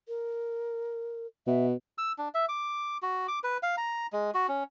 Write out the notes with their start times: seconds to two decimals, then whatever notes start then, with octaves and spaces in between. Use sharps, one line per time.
0.08 A#4
1.47 B2 E5
1.98 E6
2.18 D4
2.34 E5
2.49 D6
3.02 F#4
3.28 D6
3.44 B4
3.63 F5
3.77 A#5
4.13 G#3
4.34 F#4
4.49 C#4